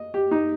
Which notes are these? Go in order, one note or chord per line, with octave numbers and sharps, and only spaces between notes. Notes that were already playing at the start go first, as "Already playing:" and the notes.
Already playing: D#5
G4
D#4